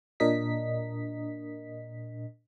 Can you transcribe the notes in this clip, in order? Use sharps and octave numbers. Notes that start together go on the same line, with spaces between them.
A#2 D4 A#4 D#5 B6